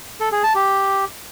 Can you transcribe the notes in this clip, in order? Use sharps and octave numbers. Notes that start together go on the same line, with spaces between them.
A4
G#4
A5
G4